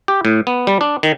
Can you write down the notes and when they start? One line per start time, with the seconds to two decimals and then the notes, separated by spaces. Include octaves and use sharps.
0.08 G4
0.25 A2
0.47 B3
0.67 G3
0.81 D4
1.03 D#3